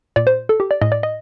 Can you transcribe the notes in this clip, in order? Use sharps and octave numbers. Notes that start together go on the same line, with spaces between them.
A#2 D5
C5
A4
G4
D5
A2 D#5
D5
D#5